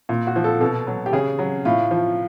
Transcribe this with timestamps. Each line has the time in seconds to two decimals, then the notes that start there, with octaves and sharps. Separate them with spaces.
0.09 A#2
0.27 F#4
0.36 F3
0.44 A4
0.61 B2 A4
0.87 F#3
1.06 G4
1.13 C#3 G#4
1.39 F#3
1.65 A2 F4
1.91 F3